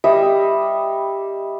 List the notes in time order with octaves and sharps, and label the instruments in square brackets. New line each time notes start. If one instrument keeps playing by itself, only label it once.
[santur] G3 D#5 E5